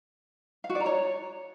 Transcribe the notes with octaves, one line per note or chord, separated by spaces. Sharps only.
F5
F#4
D5
A#5
C#5